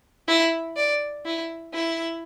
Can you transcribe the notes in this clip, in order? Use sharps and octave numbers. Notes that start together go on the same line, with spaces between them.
E4
D5
E4
E4